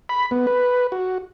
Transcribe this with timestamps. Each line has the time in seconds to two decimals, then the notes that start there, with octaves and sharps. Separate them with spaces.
0.09 B5
0.31 B3
0.47 B4
0.92 F#4